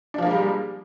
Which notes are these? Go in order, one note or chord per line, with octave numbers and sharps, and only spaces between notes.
F3 G3 G#3 A#3 D4